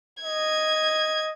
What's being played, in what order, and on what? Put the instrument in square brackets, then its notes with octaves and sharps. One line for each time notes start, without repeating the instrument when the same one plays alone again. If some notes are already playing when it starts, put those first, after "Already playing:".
[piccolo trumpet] D#5 [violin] G#6